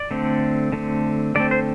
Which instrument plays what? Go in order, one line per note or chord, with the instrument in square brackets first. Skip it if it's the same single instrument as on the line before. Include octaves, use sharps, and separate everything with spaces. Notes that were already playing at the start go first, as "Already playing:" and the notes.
Already playing: [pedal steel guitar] D5
D3 A3 C4
D3 A3 C4
D3 A3 C4 D5
C5